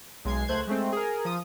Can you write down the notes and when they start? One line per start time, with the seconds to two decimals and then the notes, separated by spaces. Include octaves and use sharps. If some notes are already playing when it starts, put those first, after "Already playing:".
0.25 B1 G#3 G#6 C7
0.48 C#2 A3 C5 F#6 G#6
0.67 G#3 A3 C4
0.92 G#4 A#4
1.25 F3 D#6